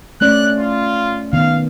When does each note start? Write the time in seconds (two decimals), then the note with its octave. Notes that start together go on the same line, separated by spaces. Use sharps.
0.21 A3 C#4 D5 F#6
0.59 F4
1.33 D#3 B3 F5